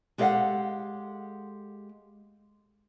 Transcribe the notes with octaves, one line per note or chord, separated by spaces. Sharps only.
G#3 G4 A4 D5 F5 F#5